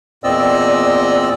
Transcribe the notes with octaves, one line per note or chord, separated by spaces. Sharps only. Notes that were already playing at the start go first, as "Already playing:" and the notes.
E2 A#2 C4 D5 D#5 E6